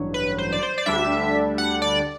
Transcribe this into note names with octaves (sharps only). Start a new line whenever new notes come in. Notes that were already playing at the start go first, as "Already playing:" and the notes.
Already playing: A1 G2 F#3
B4
C5
D5
C5
D5
D2 D3 G3 D4 E5
F#5
D5